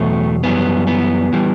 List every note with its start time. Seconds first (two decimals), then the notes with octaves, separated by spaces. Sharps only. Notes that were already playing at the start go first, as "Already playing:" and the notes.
Already playing: E2 B2 F#3 A3
0.44 F#2 E3 G3 B3
0.87 B3
1.33 E3 G3